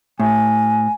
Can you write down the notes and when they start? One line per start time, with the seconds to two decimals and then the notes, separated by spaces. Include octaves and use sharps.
0.20 A2 G#5